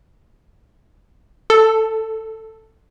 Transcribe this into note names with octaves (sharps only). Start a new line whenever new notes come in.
A4